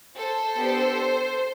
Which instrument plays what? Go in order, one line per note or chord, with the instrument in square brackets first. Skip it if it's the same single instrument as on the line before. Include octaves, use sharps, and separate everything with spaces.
[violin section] A4 C5
B3 D4 G4